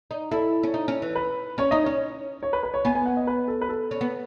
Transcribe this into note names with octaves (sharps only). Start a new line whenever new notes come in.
D#4
E4 A4
C#4
D#4
C#4
E3
B4
C#4 C#5
D#4 D#5
C#4 C#5
C#5
B4
B4
C#5
B3 G#5
G#5
F#5
D#5
B4
A4
B4
A4
C#4
B3